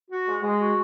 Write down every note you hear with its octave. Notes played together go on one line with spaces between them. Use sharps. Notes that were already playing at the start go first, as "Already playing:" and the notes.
F#4
G#3
G#3
F#4